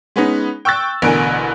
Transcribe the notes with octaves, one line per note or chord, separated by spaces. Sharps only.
G#3 B3 C#4 D#4
G5 C#6 E6 F#6 A6
A1 B2 D3 A#4 G#5 D7